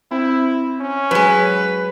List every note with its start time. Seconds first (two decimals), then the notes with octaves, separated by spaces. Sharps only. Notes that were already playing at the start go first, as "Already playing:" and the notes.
0.11 C4 E4
0.80 C#4
1.11 F#3 G#3 B4 G#5